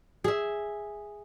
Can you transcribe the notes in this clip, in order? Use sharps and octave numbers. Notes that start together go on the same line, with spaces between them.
G#4 E5